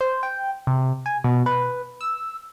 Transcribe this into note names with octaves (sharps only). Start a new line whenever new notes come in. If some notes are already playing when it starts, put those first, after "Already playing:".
C5
G5
C3
G#5
B2
B4
E6